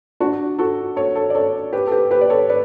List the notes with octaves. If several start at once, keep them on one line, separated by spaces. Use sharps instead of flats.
D4 F#4
F#4 A4
A4 C#5
A4 C#5
D5
A4 C#5
G4 B4
A4
G4 B4
G4 B4
D5
A4 C#5
B4 D5